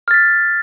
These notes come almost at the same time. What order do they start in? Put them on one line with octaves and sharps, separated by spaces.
F6 A6 B6